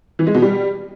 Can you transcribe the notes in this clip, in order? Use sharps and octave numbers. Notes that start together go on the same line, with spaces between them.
E3
G#3
B2
G3